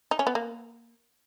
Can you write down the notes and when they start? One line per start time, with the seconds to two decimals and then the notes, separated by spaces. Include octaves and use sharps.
0.11 D#4
0.19 C#4
0.27 B3
0.35 A#3